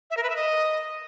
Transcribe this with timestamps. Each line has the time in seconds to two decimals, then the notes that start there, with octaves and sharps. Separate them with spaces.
0.10 E5
0.17 A#4
0.23 B4
0.30 E5
0.36 D#5